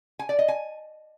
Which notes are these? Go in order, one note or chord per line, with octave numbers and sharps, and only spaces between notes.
G#5
D5
D#5
G#5